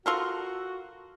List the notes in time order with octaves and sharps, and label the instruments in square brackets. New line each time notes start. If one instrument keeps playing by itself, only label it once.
[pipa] F4 A4 A#4 [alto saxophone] F#4